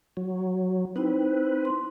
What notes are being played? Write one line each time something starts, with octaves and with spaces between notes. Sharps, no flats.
F#3
C4 D#4 E4 B4 C5
C6